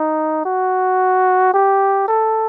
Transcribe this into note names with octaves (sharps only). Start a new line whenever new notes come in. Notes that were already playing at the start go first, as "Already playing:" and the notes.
Already playing: D#4
F#4
G4
A4